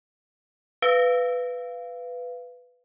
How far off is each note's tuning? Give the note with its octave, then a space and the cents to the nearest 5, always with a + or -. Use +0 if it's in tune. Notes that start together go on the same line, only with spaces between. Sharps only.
B4 +10 F5 -15